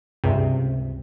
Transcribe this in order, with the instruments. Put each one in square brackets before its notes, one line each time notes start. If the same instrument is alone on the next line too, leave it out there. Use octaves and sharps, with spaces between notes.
[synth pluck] C#2 G2 C3